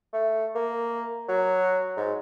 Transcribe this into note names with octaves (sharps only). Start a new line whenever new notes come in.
A3
A#3
F#3
G#2